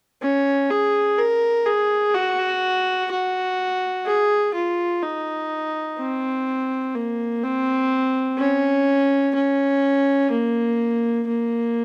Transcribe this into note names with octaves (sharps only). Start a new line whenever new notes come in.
C#4
G#4
A#4
G#4
F#4
F#4
G#4
F4
D#4
C4
A#3
C4
C#4
C#4
A#3
A#3